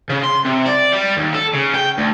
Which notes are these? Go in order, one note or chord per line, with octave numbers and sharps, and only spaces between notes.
C#3
C6
C3
D5
G3
D#2
A4
C#3
G5
D2